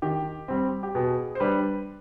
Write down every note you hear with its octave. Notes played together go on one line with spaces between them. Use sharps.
D#3 G4
G3 C4
G4
B2 G#4
C5
G3 D4 B4